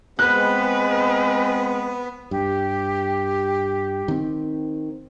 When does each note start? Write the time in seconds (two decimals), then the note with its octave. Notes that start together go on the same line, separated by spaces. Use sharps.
0.19 G#3 B3 C4 B4 F#6
2.31 G2 G4
4.08 D#3 C4